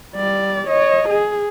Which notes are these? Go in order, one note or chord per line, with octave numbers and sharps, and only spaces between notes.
G3 D5
C#5 D#5
G#4